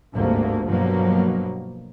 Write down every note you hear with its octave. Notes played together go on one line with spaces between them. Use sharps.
G1 D2 G#2 C3 A3 A#3
G2 B2 F3 F#3 A#3